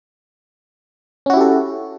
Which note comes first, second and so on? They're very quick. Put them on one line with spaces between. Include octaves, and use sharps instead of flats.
C#4 F#4 E4 G4 A4